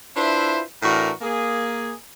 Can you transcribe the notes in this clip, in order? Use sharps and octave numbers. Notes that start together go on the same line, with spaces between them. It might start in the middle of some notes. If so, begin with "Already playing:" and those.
D4 E4 F4 B4 C5 E5
A2 E3 D4 F#4 A#4
A#3 G#4